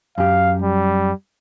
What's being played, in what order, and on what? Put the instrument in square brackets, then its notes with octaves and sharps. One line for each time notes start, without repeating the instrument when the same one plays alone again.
[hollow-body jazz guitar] F#2 G4 [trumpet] F5
[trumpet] G3